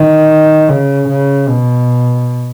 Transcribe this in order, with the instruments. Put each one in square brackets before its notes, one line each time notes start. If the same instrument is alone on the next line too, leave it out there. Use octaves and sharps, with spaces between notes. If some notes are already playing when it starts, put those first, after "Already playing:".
Already playing: [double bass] D#3
C#3
C#3
B2